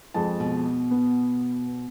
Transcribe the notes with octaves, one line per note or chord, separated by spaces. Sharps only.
F2 G#3 A5
B2
B3